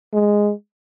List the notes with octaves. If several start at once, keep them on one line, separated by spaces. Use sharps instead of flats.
G#3